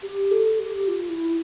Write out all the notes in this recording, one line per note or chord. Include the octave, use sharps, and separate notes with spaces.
G4
A4
G4
F4
E4